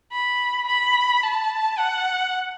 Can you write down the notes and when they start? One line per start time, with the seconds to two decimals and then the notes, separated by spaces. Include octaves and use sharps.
0.12 B5
0.67 B5
1.24 A5
1.78 F#5